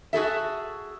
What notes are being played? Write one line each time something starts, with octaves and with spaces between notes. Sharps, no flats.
F#4 G#4 A4 E5